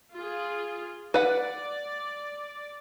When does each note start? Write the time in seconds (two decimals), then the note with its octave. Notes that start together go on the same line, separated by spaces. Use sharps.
0.15 F4 G#4
1.14 B4 D5 F#5